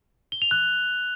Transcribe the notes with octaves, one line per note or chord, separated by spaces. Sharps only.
G7
F7
F#6